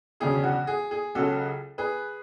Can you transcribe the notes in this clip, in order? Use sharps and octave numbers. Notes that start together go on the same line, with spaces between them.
E1 D2 C#3 F#3 C#4 G#4
F#4
G#4
G#4
C#2 C#3 F#3 C#4 F#4 A4
G#4 B4